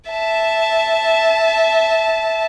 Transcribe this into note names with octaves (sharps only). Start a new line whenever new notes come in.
E5 A5